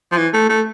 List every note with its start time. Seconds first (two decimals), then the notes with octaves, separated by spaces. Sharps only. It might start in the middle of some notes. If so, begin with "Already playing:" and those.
0.12 F3
0.17 E3
0.34 A3
0.49 A3